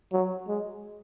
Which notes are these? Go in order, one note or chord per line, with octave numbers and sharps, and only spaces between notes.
F#3
G#3